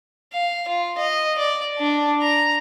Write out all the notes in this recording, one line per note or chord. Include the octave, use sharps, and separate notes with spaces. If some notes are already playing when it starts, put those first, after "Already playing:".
F5
F4
D#5
D5
D4
A#5